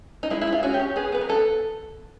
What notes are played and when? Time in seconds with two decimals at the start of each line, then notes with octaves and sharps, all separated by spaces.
0.23 D#4
0.30 G#3 E4
0.41 E4
0.47 G#3
0.53 F4
0.63 C#4 F#4
0.74 G4
0.80 C#4
0.96 B3 G#4
1.12 B3 B4
1.21 A#4
1.29 B3 A4